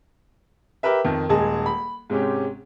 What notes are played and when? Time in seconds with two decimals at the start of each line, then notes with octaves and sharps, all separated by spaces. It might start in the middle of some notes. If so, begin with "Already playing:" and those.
0.83 G4 A#4 B4 E5
1.04 F2 D#3
1.29 D#1 G#3 G#4 D#5 A5
1.66 B5
2.10 G#2 C3 G#3 C#4 G4